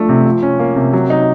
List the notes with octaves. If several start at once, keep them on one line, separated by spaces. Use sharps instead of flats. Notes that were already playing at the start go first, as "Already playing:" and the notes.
Already playing: F3 A3 D4
C3
F3
C#4
A#3
C3
F#3
D#4